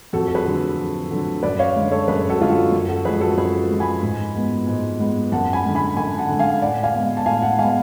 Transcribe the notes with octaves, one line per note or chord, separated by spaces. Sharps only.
F2 F#4 A4
A4
G#4 B4
D3 F#3 A3
F2
D3 F#3 A3
F#2 B4 D5
C#5 F5
D3 G#3
A4 C#5
F#2 G#4 B4
F#4 A4
D3 G#3 F4
F#4
F#2
F#4 A4
F3 G#3 G#4 B4
F#4 A4
A4
F#2 G#4 B4
F3 G#3
G#5 B5
G#2
G#3 B3
G#2
G#3 B3
F#2 F#5 A5
G#5 B5
D3 G#3
G#5 B5
F#2 G#5 B5
F#5 A5
D3 G#3
F5 G#5
A2 D5 F#5
F5 G#5
G#3 B3
A5
A2 F5 G#5
F#5 A5
G#3 B3 F5 G#5